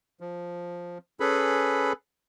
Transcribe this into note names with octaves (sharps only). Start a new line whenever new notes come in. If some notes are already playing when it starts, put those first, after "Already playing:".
F3
C#4 G#4 A4 B4 B5